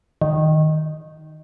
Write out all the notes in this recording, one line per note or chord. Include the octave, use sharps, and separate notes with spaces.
D#3